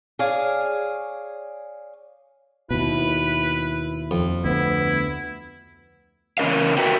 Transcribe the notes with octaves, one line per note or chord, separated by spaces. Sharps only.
G#4 C#5 D5 F5 G#5 A5
D#2 B2 E4 B4
F2
D2 B3 E4
C#3 E3 C#4 A#4 D#5 F5
F#4 A#4 B4 E5 G5